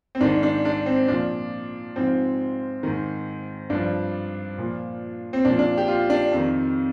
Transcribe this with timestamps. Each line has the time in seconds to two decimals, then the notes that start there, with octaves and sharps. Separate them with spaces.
0.15 C4
0.21 G#2 D#3 D4
0.43 D4
0.65 D4
0.86 C4
1.08 A#2 F3 D4
1.96 G#2 F3 C4
2.83 G#2 D#3
3.70 G2 D4
3.75 F3
4.58 A#2 F3
5.33 C4
5.45 A#2 F3 D4
5.59 D4
5.77 G4
5.88 F4
6.10 D4
6.32 F2 D#3